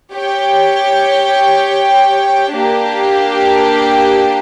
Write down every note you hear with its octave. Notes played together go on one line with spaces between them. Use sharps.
G4 C#5 G5
A#3 D4 G4